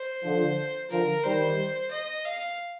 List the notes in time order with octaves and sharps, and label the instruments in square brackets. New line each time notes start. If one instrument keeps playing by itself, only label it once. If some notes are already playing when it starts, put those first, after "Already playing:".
Already playing: [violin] C5
[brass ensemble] D3 F3
[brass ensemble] D3 F3 [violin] A#4
[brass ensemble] D#3 G3 [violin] C5
[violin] D#5
F5